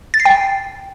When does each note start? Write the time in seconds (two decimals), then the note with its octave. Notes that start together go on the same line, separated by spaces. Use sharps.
0.14 A6
0.20 C7
0.25 G5